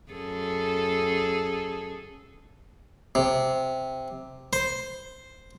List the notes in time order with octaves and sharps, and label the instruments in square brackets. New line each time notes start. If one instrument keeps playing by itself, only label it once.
[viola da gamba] F#2 G#4 A4
[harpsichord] C3
C5